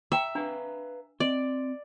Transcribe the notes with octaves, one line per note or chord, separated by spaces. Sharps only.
E5 G5 A#5
D4 B4 F5 G#5 A#5
C4 D5 D#5